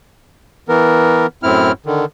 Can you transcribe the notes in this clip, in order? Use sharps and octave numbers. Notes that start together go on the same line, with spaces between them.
E3 B3 A#4
F#2 A2 C4 E4 F6
D3 D#3